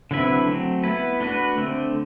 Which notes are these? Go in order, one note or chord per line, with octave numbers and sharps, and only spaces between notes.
D3 F#3 C4 E4 B4
F#3 A3 C4
B3 E4 B4
A3 D4 F#4 B4
D3 A3 C4